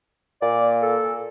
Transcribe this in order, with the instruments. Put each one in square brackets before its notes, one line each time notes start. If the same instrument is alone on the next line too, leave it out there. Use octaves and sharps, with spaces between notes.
[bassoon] A#2 [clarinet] D5
[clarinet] A4